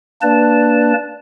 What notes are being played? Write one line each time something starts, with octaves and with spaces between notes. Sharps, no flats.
A#3 D4 B4 D5 A5